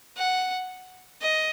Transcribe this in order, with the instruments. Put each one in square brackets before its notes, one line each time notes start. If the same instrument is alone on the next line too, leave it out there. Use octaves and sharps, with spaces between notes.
[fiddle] F#5
D#5